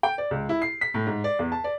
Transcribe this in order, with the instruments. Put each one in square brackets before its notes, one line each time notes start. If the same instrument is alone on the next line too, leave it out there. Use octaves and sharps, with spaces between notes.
[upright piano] G5
D5
C#2
E4
C7
B6
A2
G#2
D5
E2
A5
D5